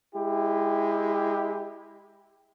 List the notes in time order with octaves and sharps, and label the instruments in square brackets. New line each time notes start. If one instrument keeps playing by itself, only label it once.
[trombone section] G#3 E4 G4